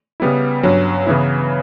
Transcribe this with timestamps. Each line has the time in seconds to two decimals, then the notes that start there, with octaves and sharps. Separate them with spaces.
0.20 C#3 G3 B3 E4
0.63 G2 F#3 C#4
1.06 C#3 E3 B3 E4